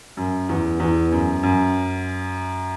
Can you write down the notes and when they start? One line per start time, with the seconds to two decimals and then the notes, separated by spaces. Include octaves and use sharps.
0.17 F#2
0.49 E2
0.80 E2
1.12 F#2
1.43 F#2